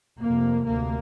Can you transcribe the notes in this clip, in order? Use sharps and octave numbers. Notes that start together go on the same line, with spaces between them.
F1 F2 C3 A#3
D2 C3 A#3